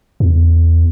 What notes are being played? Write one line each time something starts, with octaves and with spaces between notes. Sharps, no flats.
E2